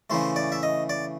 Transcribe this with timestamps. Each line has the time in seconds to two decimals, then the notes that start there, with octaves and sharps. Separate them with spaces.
0.10 C#3 E3 A3 C5
0.36 D5
0.52 E5
0.63 D#5
0.89 D5